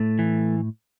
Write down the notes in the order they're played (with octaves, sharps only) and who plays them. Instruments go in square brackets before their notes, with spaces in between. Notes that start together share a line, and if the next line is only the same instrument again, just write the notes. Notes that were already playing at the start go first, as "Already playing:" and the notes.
Already playing: [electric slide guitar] A2 A3
E3